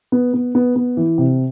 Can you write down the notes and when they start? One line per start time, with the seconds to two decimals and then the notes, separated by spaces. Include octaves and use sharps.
0.12 B3
0.34 B3
0.55 B3
0.76 B3
0.97 E3
1.18 C3